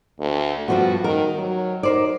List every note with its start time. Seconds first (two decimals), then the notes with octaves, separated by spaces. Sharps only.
0.20 D2
0.68 G2 F3 B3 F#4
1.04 D#3 A#4
1.38 F#3
1.83 D#4 A#4 C5 D5